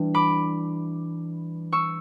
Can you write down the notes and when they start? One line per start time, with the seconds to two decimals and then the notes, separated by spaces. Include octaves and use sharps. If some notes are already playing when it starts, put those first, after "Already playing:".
Already playing: E3 G3 D4
0.14 B5 D6
1.72 C#6 E6